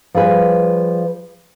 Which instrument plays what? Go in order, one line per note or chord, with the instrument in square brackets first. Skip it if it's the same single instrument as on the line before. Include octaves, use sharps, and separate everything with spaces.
[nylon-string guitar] F3 G3 G#4 B4